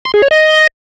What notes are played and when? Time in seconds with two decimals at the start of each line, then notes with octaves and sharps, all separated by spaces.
0.05 C6
0.14 G#4
0.22 C#5
0.31 D#5